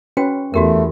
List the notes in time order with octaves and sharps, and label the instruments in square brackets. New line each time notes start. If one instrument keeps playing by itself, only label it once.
[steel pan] C#4 B4 [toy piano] F#4 G5
[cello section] E2 [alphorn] A3 [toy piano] F#4 G4 A#4